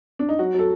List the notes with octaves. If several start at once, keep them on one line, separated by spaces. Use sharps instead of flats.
D4
D#4
F#3 F#4
F#3 A4